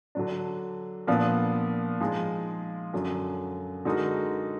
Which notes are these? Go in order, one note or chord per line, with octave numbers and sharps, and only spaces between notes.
D3 F#3 D4
A#2 F3 B3 D4
F3 G#3 D#4 G#4
F#2 D3 F#3
D3 G#3 D#4 F#4 A#4